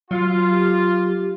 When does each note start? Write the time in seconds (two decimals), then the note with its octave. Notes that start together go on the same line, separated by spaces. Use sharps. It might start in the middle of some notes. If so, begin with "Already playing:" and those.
0.11 F#3 F4
0.50 G4